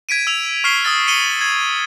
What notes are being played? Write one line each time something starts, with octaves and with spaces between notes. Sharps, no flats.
G#6 B6 D7 D#7
E6 F7
C#6 F6 B6 C7 G7
D#6 E6 A6
C7 C#7 D#7 F#7 G7
G#6